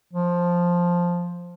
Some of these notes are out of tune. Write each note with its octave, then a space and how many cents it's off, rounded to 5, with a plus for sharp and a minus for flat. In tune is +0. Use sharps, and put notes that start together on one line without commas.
F3 +5